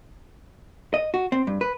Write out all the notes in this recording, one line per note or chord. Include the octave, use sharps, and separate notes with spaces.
D#5
F#4
C4
G2
B4